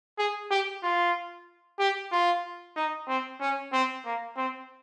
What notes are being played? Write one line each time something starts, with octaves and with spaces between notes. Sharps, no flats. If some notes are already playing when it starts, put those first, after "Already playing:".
G#4
G4
F4
G4
F4
D#4
C4
C#4
C4
A#3
C4